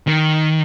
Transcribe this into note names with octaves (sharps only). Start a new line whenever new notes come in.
D#3